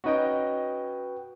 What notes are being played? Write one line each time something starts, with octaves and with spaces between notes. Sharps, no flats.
C#4 D#4 F#4 B4 D#5 G5